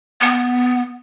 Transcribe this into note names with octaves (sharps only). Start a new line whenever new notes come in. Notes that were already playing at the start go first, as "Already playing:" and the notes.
B3